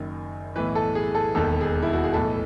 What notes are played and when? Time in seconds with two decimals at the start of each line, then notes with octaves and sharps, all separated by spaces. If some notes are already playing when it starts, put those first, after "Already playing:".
Already playing: F#1 F#2 D#3
0.56 B1 A2 E3 B4
0.75 A4
0.95 G#4
1.15 A4
1.35 E1 D#2 D#3 A4
1.61 G#4
1.82 E4
1.93 F#4
2.03 G#4
2.14 B1 A2 E3 A4